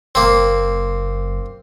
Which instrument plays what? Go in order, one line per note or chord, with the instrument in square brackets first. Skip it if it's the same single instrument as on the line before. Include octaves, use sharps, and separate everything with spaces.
[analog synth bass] F#1 [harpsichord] A#3 C4